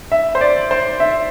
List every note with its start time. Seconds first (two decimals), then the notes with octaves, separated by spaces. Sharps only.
0.12 E5
0.35 C5
0.41 D5
0.71 C5
1.00 E5